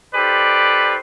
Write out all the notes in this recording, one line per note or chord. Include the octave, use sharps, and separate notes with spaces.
D#4 G4 A4 B4 C5 D5